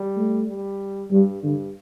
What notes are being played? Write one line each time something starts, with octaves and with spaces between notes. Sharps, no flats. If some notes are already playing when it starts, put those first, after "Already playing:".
Already playing: G3
A3
G3
G2 G3
G2 D3